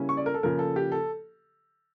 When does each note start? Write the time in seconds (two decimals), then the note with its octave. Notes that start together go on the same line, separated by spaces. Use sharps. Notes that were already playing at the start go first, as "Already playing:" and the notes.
Already playing: C#3 G3 A#3 C#4 E4
0.09 C#6
0.17 D5
0.26 A#4
0.34 A4
0.43 C#3 F3 A#3 A#4
0.59 A4
0.76 G4
0.92 A4